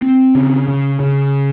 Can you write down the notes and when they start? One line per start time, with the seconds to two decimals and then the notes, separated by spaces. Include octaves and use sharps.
0.02 C4
0.35 C#3
0.68 C#3
1.00 C#3